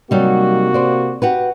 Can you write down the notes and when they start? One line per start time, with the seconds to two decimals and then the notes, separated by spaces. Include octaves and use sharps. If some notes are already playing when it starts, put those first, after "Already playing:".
0.11 C3 F#3 G3 A#3 D#4 F#4
0.74 C5 D5
1.22 F#4 G4 B4